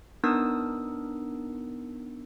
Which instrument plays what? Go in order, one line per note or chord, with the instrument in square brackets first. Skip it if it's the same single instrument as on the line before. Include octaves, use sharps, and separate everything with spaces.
[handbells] B3 D4 D#4 A#4 D#6 E6